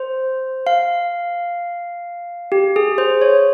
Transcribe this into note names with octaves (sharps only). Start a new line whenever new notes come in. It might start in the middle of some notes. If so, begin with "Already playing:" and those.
Already playing: C5
F5
G4
G#4
C5
C#5